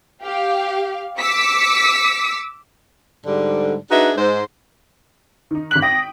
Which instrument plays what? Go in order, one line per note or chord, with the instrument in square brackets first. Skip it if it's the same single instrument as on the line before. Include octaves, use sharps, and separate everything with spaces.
[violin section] G4 F5
D6 E6 B6 C#7
[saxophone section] G#2 D3 G3
D4 D#4 F#4 G#4 B4 E5
G#2 C5
[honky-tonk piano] D#3 D#4
[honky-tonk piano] G#1 B6 F#7 [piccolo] F#6
[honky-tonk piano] G5 D#6 [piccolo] A#6